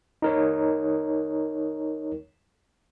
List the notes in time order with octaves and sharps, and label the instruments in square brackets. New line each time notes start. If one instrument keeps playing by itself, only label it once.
[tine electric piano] D#4 A#4 C#5